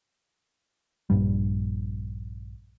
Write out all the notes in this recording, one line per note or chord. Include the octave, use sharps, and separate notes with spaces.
A#1 G2 G3